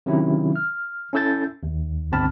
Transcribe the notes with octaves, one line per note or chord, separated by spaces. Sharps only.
C3 D#3 F#3 C#4 E4
F6
C#4 E4 A4 E6 G6 A6
D#2
G1 C#2 C4 A5 B5 F6